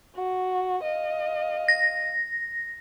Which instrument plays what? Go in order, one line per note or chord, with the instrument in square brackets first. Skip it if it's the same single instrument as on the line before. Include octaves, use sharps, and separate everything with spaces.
[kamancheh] F#4
D#5 F5
[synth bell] A#6